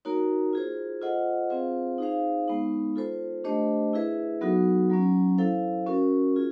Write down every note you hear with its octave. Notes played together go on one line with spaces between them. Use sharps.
A#3 D#4 F#4 A#4 C#5
F4 G#4 C5
F4 A4 C5 D#5 F#5
C4 F4 G#4 C5 F5
D#4 G#4 C5 F5
G#3 B3 D#4
F4 A4 C5
A3 D4 G4 C5 D#5
E4 G#4 B4 E5
F#3 B3 D#4 F#4 A4
F#3 A#3 C#4
E4 A4 C5 F5
C#4 F#4 A#4
F4 G#4